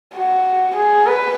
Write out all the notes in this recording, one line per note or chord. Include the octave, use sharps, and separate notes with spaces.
F#4
G#4
B4